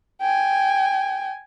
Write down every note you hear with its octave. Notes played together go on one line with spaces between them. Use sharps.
G5 G#5